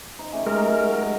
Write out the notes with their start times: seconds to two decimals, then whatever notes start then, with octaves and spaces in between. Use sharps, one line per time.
0.19 D#4 C5
0.32 A3 C#4 G4
0.47 G#3 A#4 D#5
0.68 F#3